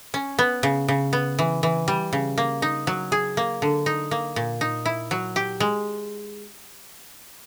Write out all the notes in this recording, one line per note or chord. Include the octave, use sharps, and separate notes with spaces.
C#4
B3
C#3
C#3
B3
E3
E3
G3
C#3
A#3
D#4
F#3
G#4
A#3
D3
D#4
A#3
A#2
D#4
E4
F#3
G4
G#3